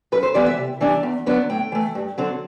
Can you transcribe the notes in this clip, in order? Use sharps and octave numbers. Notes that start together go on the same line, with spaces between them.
F#2 B4
C5
E3 G3 B3 E4 D5
E5
C3
E3 G3 D4
E2
D3 F#3 B3 D4
A2 G5
E3 A3
G2
D3 F#3 C4